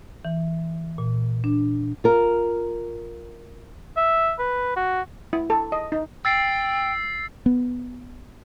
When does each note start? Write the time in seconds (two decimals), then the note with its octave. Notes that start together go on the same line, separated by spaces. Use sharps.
0.25 E3
0.98 A#2
1.44 D4
2.04 F4 A#4
3.97 E5
4.39 B4
4.76 F#4
5.33 E4
5.50 A4
5.72 D#5
5.92 D#4
6.25 G5 E6 A6 C7
7.46 B3